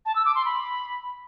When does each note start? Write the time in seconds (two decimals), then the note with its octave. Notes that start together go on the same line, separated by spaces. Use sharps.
0.06 A5
0.16 E6
0.25 D6
0.35 C6
0.45 B5